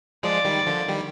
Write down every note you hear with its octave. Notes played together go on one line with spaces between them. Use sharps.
F3 G#3 D5
D#3 G3
D3 F3
D#3 G3